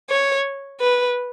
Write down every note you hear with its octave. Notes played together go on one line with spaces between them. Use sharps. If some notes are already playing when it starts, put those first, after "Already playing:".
C#5
B4